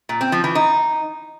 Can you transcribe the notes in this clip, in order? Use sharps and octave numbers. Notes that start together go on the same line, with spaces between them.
A#2
C4
F3
E3
D#4